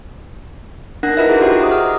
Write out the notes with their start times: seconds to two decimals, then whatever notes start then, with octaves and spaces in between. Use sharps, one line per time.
1.03 D4 D#4 A#4 F#5 F#6 A#6
1.17 E4 F4 A#4 B4 D#5 E5
1.29 E4 F#4 G#4
1.41 F#4 G4 C5 F#5
1.60 D#5 A#5 D6 D#6
1.72 F6